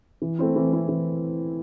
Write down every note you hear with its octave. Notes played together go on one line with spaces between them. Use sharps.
E3
A3 C4 E4
E3
A3 C4 E4
E3